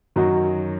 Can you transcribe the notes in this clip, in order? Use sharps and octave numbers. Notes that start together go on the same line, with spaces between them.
F#2 D#3 F#3 D#4 F#4